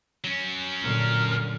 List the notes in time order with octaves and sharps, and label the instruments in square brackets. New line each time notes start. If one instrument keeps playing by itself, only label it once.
[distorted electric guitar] F#3 C#4
[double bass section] F#2 A#2 D3 [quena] A#4